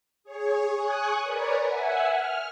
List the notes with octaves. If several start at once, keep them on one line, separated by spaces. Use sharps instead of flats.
G#4 C#5
G#5 C#6 D#6 F#6
A#4 B4 C#5 D5
E5 F#5 G#5
F6